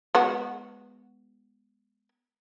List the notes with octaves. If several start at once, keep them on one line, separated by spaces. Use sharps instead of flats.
G#3 B3 F#4